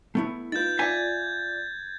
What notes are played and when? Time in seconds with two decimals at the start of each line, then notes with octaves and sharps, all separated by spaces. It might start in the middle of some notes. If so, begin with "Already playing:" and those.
0.15 A3 B3 E4
0.52 D#4 F4 B4 G6 A6
0.79 F4 D5 E5 F5 G#5 G#6